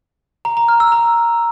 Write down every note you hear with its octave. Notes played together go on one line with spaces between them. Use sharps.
A#5
A#5
F6
E6
A#5